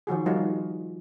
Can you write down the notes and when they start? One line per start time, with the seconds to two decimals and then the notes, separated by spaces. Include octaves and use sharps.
0.07 D#3 F3 F#4 G#4
0.26 F3 G3 D#4 F4 F#4